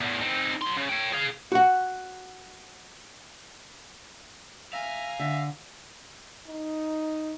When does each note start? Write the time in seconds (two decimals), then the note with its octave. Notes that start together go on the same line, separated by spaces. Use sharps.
0.01 E2 A2
0.21 C4 D#4
0.61 F#3 C6
0.76 C#3
0.89 C#5 G5
1.13 G#4 F5
1.52 F#4 F#5
4.73 E5 F5 G#5 A#5
5.20 D3 E5
6.48 D#4